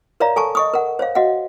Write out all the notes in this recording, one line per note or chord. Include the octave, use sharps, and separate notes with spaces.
A#4 C#5 D5 E5 F5 A#5
A4 G#5 A5 C#6
D#5 C#6 D#6
A#4 F#5
C5 C#5 F5
F#4 D#5 F5 F#5